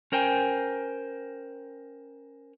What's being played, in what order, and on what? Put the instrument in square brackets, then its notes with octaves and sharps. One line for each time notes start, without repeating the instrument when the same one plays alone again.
[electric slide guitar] C#4 A#4 C5 G5 G#5